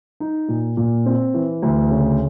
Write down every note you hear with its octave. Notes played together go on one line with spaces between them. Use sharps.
D#4
A#2
A#2
C4
E3
D2
C#3